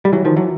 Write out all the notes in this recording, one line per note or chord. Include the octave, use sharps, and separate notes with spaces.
G3
E3 F#3
D#3 F3
E3 F#3